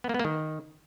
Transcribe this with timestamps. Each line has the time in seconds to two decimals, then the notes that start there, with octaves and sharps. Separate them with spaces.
0.04 B3
0.09 A#3
0.14 B3
0.19 A#3
0.25 D#3